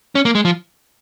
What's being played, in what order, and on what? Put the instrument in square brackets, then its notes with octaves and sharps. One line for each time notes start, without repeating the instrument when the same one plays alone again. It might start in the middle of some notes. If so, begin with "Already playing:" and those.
[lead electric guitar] C#4
A#3
G#3
F3